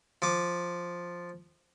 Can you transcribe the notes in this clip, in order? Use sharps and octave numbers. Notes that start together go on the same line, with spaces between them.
F3 D6